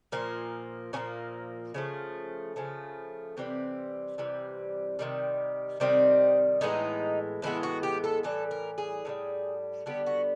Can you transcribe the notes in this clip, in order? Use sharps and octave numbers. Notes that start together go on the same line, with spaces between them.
A#2 F3 A#3
A#2 F3 A#3 C#4
C#3 F3 A3
C#3 F3 A3
C3 E3 G3 C4
C3 E3 G3
C3 D#3 G3
C3 D#3 G3 C4
A2 E3 G#3 B3 D#4
A2 E3 G#3 B3 E4
F#4
G4
A4
A2 E3 G3 A4
A#4
G#4
A2 E3 G3
D3 G3 B3 G4
F#4